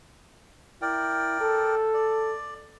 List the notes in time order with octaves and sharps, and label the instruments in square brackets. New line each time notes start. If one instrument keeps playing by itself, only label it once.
[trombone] E4 [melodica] A#4 D5 G5
[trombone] A4
[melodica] D5